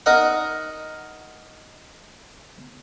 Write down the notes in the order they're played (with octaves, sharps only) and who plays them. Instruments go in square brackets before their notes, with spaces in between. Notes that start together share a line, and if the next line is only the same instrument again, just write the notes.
[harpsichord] D#4 A#4 D#5 F#5